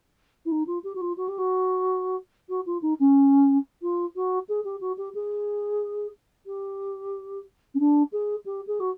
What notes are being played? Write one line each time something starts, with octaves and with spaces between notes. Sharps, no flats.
E4
D#4
F4
G4
F#4
F4
F#4
G4
F#4
F#4
F4
D#4
C#4
F4
F#4
G#4
G4
F#4
G4
G#4
G4
C#4
D4
G#4
G4
G#4
F#4